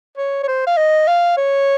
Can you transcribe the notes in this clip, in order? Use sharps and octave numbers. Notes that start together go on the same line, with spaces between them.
C#5
C#5
C5
F5
D#5
F5
C#5